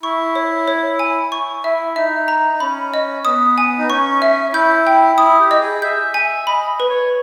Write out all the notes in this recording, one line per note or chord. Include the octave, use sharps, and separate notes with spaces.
E4 C#6
C#5
C#5
G#5
C#6
E4 E5
D#4 E5
A#5
D#4
C#4 B5
D#5
B3 D#6
G#5
D#4
C#4 C#6
E5
E4 G6
G5
E4 D#6
G4
D#5
G#4
E5 G6
E5 G#5
D#5 B5
B4
C#5